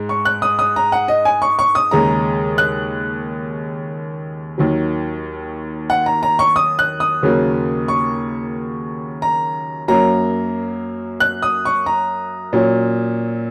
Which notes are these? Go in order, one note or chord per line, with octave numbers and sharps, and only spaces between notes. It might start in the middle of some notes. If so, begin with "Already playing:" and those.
Already playing: G#2 G#3
C#6
F#6
D#6
D#6
A#5
F#5
D#5
G#5
C#6
C#6
D#6
D#2 C#3 G#3 C#4 A#5
F#6
D#2 D#3 F#3
F#5
A#5
A#5
C#6
D#6
F#6
D#6
D#2 C#3 F#3 A#3
C#6
A#5
F#2 F#3 A#3 A#5
F#6
D#6
C#6
A#5
A#2 F#3 C#4